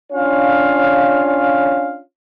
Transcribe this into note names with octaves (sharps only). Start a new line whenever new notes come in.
C#4 D4 F4 C#5 F5